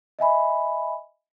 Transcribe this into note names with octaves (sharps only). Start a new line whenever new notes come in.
D#5 E5 G#5 B5